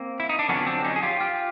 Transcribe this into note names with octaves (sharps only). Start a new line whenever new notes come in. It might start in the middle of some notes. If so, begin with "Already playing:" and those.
Already playing: A#3 C4
E4
D#4
D4
F2 D3 F#3 B3 C#4
C4 D4
C#4 D#4
G#4
F4 G4
F4 G4